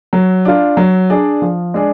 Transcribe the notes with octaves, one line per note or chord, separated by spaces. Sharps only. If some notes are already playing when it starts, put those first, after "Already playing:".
F#3
D4 F4
F#3
D4 G#4 D5
F3
G#3 D4 G#4 D5